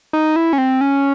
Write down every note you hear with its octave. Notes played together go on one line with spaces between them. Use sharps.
D#4
E4
C#4
C4
C#4